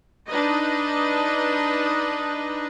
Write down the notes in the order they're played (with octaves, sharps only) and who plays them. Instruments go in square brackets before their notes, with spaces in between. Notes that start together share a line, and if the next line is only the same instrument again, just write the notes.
[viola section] D4 D#4 B4 D#5